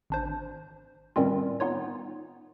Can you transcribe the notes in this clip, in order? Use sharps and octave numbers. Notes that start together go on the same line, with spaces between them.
G#1 D4 C5
A2 D#3 G3 C4 C#4 F4
B3 D#4 F4 C#5